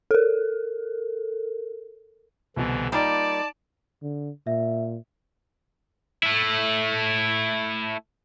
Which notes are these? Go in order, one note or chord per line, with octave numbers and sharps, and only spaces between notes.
A4 A#4
C2 B2 D3 E3
G3 A#3 D#4 F4 D5 A5
D3
A#2 E5
A3 E4